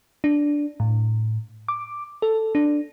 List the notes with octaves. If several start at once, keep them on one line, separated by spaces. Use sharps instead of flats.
D4
A2
D6
A4
D4